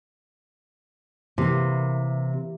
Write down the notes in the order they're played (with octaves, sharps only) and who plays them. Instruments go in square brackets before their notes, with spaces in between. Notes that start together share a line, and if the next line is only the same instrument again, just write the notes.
[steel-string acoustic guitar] C3 [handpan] E3 A#3